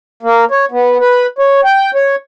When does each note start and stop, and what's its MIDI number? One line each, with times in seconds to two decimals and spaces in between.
0.23 0.45 58
0.51 0.65 73
0.71 0.98 59
1.00 1.26 71
1.39 1.61 73
1.64 1.91 79
1.95 2.15 73